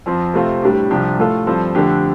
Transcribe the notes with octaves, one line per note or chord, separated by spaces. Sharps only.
F2 F3 C4
C3 A3 C4 F4
A2 G3 D4 G4
C2 C3 F3 D4 G4
A2 A3 F4 A4
G2 F3 C4 A4
F2 D3 A3 D4 G4